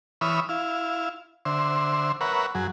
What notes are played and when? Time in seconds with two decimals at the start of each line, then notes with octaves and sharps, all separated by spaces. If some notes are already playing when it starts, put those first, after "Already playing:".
0.21 E3 C#5 E5 B5 D#6 F6
0.49 E4 F5
1.45 D3 C5 E5
2.21 A#4 B4 C#5 E5 F#5
2.55 F#2 F#3 G#4